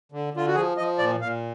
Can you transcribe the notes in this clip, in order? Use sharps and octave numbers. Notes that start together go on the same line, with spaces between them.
D3
D3 F4
F#4
F3 G#4
F3 D#5
A#2 D5
A#2 F5